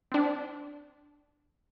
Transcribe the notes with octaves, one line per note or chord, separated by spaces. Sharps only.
C4 D4